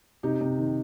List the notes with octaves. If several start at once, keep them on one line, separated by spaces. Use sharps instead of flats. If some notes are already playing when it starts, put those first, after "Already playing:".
C3 D#4 G4
C3
D#3